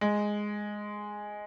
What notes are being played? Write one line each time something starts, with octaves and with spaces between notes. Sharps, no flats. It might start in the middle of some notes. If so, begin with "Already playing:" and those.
G#3